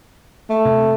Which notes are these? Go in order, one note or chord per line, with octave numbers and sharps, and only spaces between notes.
A3
C3